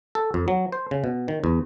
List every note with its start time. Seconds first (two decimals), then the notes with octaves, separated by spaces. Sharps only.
0.15 A4
0.34 F2
0.48 F#3
0.72 C5
0.91 C#3
1.04 B2
1.28 D#3
1.44 E2